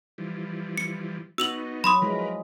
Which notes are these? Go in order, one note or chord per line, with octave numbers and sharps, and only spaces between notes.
E3 F3 G3
C#7
B3 D#4 F#4 E6 F7 F#7
F#3 B5 C6 D#6
F3 G#3 E4 A#4 B4